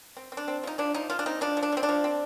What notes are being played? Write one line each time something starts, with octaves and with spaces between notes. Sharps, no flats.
C4
C4
D4
C4
F3 D#4
F3 D4
F3 D#4
F3 F4
D4
C4 D#4
F3 D4
F3
D4
F3 C4
D4
F3
C4